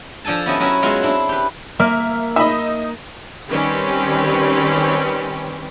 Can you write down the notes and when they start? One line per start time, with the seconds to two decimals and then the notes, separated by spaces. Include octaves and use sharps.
0.25 F3 D4 A4 G#5 A5
0.46 B3 C#4 E4 G4 D#5
0.60 F#3 C#4 E4 A#4 C#5 E5
0.83 F#3 G#3 B3 E4 F4
1.03 C4 D4 E4
1.29 G4 B4
1.79 A#3 E5 F6
2.36 D#4 D#5 E5 B5
3.48 D#3 G3 C4 C#4 G4 B4